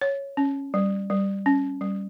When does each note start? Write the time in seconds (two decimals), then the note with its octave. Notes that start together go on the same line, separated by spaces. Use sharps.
0.01 C#5
0.37 C#4
0.74 G3
1.10 G3
1.46 C#4
1.81 G3